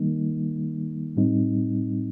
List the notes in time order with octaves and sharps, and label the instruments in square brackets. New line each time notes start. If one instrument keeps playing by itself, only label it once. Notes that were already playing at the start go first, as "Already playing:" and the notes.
Already playing: [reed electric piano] D#3 G3 A#3 D#4
A2 G3 C4 D#4